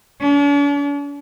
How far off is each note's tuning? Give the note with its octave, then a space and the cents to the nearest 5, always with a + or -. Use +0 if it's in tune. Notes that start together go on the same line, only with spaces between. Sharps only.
D4 -45